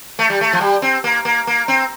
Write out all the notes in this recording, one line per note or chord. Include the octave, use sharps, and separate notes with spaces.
A3
G3
A3
F3
G3
C4
A#3
A#3
A#3
C4